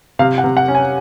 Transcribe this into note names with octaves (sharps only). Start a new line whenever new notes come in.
C3 F5
F#5
C3
F#5
C#4
G#5